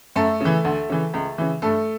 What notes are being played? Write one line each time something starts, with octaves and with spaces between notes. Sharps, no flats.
F#2 A3 A4
C#3 E3
D2
C#3 E3
C#2
C#3 E3
G2 A3 A4